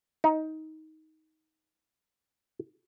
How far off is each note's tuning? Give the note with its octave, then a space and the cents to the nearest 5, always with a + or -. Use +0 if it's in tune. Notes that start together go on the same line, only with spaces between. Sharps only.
D#4 +15